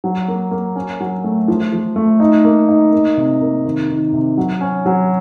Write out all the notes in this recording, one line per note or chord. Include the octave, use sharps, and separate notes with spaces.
F#3
A#3
A#3
C#4
F#3
A3
F3
F3
A3
D#4
A#3
D#4
A#3
C3
A#3
D#3
D#3
C3
F#3
C#4
F#3